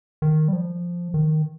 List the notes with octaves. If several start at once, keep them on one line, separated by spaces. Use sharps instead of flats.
D#3
G3
F3
D#3